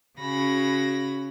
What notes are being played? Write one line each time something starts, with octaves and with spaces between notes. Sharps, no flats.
C#3 C#4 F#4 B5 A#6